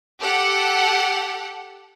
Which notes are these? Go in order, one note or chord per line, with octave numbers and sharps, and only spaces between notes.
G4 A4 F#5